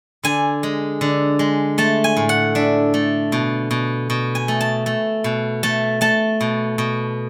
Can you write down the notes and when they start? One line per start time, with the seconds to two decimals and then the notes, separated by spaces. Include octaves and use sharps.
0.23 D3 G#5
0.63 G#3
1.01 D3
1.39 G#3
1.78 A3 A5
2.04 G#5
2.17 A2
2.29 F#5
2.55 D4 E5
2.94 A3
3.32 B2
3.71 B2
4.10 B2
4.35 G#5
4.48 A3
4.61 A5
4.86 A3
5.24 B2
5.63 A3 A5
6.01 A3 A5
6.41 B2
6.78 B2